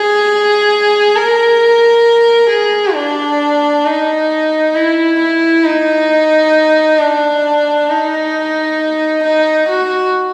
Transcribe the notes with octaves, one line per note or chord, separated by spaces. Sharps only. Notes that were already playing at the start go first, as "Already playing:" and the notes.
Already playing: G#4
A#4
G#4
D4
D#4
E4
E4
D#4
D4
D#4
D#4
F#4